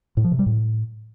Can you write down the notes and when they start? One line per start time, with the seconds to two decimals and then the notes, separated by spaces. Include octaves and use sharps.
0.17 A2
0.24 F3
0.32 C3
0.39 G3
0.46 A2